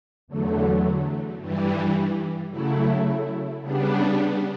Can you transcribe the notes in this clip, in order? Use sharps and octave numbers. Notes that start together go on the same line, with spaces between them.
E2 D3 F#3 A3
G2 E3 G3
C#3 F#3 A3 E4
C#3 G3 B3 D4